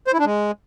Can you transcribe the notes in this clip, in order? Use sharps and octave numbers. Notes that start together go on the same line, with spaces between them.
C5
E4
D4
G#3